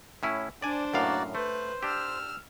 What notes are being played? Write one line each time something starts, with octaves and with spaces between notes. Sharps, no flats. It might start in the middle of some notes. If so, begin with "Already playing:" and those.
A2 C#4 E4
D4 C5 D5 G#5
F#2 A2 A#3 F#4 D5 F5
A3 B4 C5
D4 G4 E6 F6